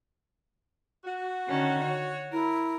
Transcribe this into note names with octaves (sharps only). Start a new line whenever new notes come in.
F#4
D3 D#3 C#4
C#5
E4 A#4